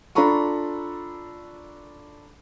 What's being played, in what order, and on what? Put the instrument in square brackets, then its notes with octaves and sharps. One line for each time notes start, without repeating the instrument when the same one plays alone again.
[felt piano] D4 F4 A4 A#5 B5 C#6